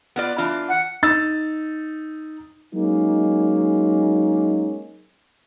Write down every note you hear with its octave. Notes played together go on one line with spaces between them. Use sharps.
B3 F4 D5
E3 D4 F4
F#5
D#4 E6 A6
F#3 G#3 A#3 C#4 D#4